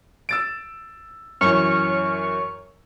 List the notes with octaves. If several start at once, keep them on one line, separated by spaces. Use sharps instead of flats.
E6 A6 D7
F#2 E3 C#5 C#6 F6